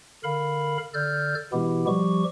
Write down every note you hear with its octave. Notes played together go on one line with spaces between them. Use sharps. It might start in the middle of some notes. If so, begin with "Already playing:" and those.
D3 A#4 F5 B5
D3 A4 D5 F6 G6
B2 E3 G#3 B3 E4 G4
F3 G3 G4 C#6